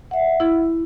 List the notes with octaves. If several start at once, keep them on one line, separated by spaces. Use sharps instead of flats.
E5 F#5
E4